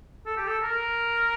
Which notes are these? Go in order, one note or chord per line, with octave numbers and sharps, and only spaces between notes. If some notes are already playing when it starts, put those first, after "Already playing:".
A4
G4
A4
A#4